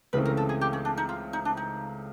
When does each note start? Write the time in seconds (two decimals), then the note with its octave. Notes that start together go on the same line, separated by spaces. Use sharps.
0.13 C#2 C#3 E3 A3 C4 B4
0.25 A#4
0.37 A4
0.49 G#4
0.61 G4
0.73 C#4
0.85 D4
0.97 D#4
1.09 F4
1.33 D#4
1.45 D4
1.57 D#4